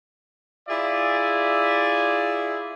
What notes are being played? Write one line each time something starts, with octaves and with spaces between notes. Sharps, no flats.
E4 F4 G#4 D5 E5